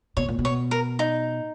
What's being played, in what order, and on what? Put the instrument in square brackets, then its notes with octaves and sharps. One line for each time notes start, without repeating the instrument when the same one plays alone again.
[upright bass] B2 [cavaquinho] C#5
[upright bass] A#2
B2
[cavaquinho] C#5
A#4
D#4